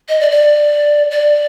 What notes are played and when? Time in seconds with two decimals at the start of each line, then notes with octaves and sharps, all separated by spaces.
0.09 D#5
0.21 D5
0.31 D5
1.11 D5